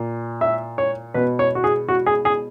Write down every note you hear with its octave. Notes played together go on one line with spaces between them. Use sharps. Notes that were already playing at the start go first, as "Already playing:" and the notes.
Already playing: A#2
E5
C#5
B2 B4
C#5
F#4
G#4
F#4
G#4
G#4